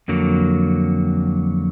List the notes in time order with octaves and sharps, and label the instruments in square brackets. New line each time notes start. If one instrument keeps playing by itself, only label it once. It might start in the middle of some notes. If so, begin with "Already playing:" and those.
[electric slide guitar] F2 D3 F#3 A#3